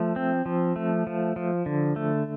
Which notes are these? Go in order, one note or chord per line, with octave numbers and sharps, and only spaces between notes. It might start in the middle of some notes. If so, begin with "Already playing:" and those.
Already playing: F3 A3
C4
F3
A3
F3
F3
D3
A3